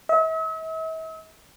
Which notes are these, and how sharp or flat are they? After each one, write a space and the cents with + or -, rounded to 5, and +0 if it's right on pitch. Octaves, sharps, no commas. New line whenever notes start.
E5 -45